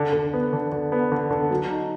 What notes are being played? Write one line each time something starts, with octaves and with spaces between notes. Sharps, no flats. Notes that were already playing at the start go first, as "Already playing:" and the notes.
Already playing: D3
D3
B3
D3
D3
B3
D3
D3
F#3
D#4